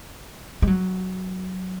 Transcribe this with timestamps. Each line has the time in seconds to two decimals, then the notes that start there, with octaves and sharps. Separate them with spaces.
0.62 G#3
0.67 F#3